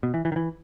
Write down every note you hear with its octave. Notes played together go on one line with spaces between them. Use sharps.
B2
E3
E3
D#3
E3